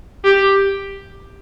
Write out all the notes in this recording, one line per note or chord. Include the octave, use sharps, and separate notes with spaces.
G4